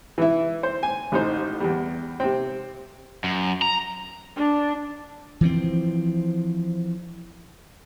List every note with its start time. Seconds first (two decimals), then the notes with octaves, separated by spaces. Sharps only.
0.18 E3 E4
0.63 C5
0.83 G#5
1.12 A1 D#4 C5
1.60 E2 G3
2.20 C3 C4
3.24 F#2
3.62 A#5
4.36 D4
5.41 E3 F3 C4